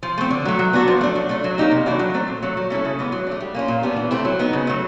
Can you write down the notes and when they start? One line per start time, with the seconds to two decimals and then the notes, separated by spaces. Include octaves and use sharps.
0.03 F3
0.18 A3 C4
0.30 D3
0.45 F#3 A3
0.59 F#3
0.73 B3 D4 F#4
0.88 F3
1.01 A3 D4
1.15 F#3
1.29 A3 D4
1.44 F#3
1.58 A#3 D#4 G4
1.71 C3
1.86 E3 A3 D4 F#4
1.99 F#3
2.14 A3 C4
2.28 A#2
2.43 F#3 A3
2.57 F#3
2.70 A3 C#4 E4 A4
2.85 C#3
2.99 E3 G#3 B3
3.12 F#3
3.27 A3 D4
3.40 G3
3.55 A#3 C#4 F4
3.68 A#2
3.83 G3 B3 D4
3.96 E3
4.11 A3 C4 E4
4.25 F#3
4.39 B3 D#4
4.53 C#3
4.67 F#3 A3